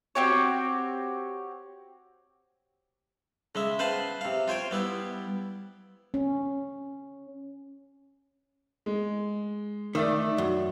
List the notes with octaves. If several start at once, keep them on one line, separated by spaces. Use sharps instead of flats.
C4 F#4 G4 C#5
C#3 G#3 E5
B4 C5 F5 F#5 A5 C6
C3 F5
F4 C5 C#5 G5
G3 B3 E4
C#4
G#3
D#3 A3 D5 E5 E6
F#2